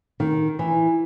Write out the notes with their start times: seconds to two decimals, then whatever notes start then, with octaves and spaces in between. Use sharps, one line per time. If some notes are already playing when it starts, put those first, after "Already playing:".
0.20 D#3
0.59 E3